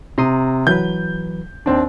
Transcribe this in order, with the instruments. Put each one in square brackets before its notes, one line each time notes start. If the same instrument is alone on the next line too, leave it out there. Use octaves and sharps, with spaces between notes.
[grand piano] C3 [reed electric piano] A#5 C6 D#6
[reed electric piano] E3 F#3 B4 [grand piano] G6
[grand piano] D#2 C4 D4